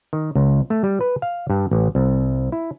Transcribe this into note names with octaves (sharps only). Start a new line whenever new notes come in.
D#3
C#2
A3
G3
B4
F5
G2
A1
C2
E4